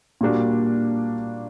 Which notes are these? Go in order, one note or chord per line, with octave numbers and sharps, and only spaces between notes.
A#2 G3 A#3 D4 F#4